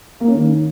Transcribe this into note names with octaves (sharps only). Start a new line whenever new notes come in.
A#3
C#4
D#3